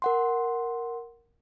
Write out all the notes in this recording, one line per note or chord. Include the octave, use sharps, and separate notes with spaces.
A#4 F#5 C6